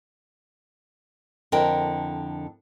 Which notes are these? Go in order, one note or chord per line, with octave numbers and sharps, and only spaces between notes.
F2 D3 E4 A#4 G5